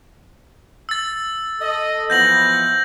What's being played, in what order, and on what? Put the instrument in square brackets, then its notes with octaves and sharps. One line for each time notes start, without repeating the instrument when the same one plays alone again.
[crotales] E6 A6
[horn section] A4 D#5
[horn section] E3 F3 B3 [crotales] G6 A#6 F#7